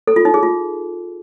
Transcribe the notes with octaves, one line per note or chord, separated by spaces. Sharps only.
A4
F4
D#4
G#4
F4